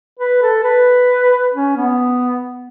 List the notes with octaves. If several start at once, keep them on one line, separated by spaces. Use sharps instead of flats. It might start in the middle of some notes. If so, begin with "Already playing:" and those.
B4
A4
B4
C#4
B3